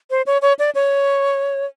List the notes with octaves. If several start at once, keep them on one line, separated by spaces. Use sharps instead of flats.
C5
C#5
C#5
D5
C#5